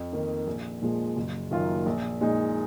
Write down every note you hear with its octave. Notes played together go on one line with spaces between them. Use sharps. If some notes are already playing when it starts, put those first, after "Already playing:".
Already playing: F2
D#3 A#3 D#4
A#1
A#2 F3 G#3
F#1
F#2 D#3 A#3 F4
A#1
A#2 G#3 D#4